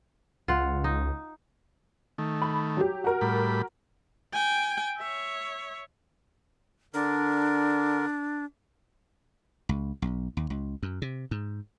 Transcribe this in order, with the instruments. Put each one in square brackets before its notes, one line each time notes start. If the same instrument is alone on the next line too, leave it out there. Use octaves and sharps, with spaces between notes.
[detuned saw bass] C#2 [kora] F4 F#5
[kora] D#4
[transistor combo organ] D#3 A3
[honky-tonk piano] B5
F#3 G4
F#4 A#4
[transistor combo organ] A2 G3 B5
[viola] G5 G#5
C#5 E5
[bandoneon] D3 A#4 [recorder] D4
[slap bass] C#2
B1
D#2
C#2
F#2
C3
G#2